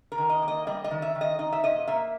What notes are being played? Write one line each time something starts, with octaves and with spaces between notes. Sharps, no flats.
A#4
D#3
D#5
A#3
D#5
G3 D#5
D#5
D#3
E5
D#3
D#5
D#4 D#5
E5
A#2 D#5
A#3 E5